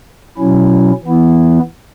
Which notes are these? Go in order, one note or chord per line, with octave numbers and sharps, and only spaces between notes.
B2 F#3 C#4 E4
E3 B3 E4